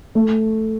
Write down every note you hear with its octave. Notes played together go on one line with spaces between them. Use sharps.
A3